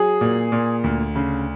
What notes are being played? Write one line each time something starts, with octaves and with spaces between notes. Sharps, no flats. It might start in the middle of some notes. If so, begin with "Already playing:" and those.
Already playing: F#3 G#4
A#2
A#2
D2
C#3